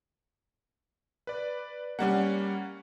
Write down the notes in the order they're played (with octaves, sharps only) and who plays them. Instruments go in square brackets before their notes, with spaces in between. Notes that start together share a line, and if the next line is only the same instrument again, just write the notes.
[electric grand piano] B4 D5
[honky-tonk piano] G3 F#5 [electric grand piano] A#3 C#4